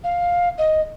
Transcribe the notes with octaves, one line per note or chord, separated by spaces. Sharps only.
F5
D#5